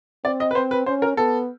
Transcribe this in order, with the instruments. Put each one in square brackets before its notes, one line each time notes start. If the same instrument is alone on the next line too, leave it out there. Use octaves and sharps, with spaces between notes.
[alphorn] C4 [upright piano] D5
[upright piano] D#5
B4
[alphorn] C4 [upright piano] C5
[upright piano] B4
[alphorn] C#4 [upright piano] C5
[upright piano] A#4
[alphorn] B3 [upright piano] A4